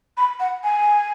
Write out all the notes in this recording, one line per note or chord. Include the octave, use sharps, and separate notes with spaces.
B5
F#5
G#5